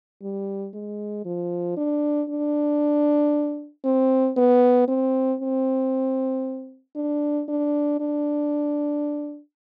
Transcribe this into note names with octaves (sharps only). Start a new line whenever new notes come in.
G3
G#3
F3
D4
D4
C4
B3
C4
C4
D4
D4
D4